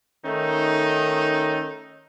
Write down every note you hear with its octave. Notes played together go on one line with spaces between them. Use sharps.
D#3 A3 C#4 D#4